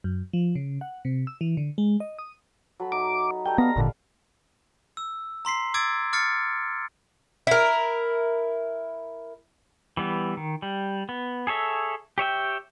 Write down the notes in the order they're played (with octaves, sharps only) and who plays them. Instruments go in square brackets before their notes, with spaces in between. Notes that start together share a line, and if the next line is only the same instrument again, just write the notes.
[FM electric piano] F#2
F3
C#3
F#5
C3
E6
E3
D3
G#3
D#5
D#6
[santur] F#3 A4 B5
[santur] D#4 E5 [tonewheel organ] D6
[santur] G3 A3 A#5 [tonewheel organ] G5
[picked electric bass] B3 [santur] D5 F5 B5 [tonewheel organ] A#5
[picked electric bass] G#1 A#2 D3
[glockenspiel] E6
A#5 C6 B6 C7
D6 E6 G#6 A6 D7
D6 F6 A6 C7 C#7
[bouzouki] E4 A#4
[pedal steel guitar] E3 G3 B3
D#3
G3
B3
G#4 A4 C#5 E5
G4 C#5 E5 G5